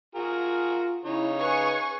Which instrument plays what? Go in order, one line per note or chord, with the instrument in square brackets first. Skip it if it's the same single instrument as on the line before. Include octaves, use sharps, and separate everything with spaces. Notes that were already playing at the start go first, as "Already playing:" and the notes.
[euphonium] F4 [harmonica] F#4 G#4 A#4
[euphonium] C#3 [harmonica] D#4 C#5 [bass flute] E4
[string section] G#4 G#5 C#6 [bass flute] B4